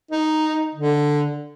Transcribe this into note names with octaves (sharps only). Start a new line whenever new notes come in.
D#4
D3